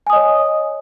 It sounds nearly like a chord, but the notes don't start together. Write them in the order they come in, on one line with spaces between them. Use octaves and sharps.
G#5 D#6 D#5 C#5